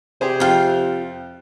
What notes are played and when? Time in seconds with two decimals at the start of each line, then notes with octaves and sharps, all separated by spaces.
0.21 C3 G4 G#4 C5
0.40 F2 F4 G5